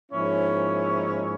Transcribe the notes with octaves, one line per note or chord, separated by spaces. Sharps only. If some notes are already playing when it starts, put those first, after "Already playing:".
G#2 F3 A#3 C#4 E4 C#5